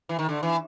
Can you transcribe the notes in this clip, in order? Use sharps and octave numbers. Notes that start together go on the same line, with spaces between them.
E3
D#3
D3
E3